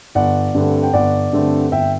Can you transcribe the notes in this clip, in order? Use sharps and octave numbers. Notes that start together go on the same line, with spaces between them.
G1 D5 F#5
G2 D3 A3 C4
G5
G1 D5 F#5
G2 D3 A3 C4
G1 E5 G5